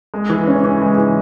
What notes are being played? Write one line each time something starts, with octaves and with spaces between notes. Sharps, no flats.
G#3
E3
C#4
E3
G#3
E3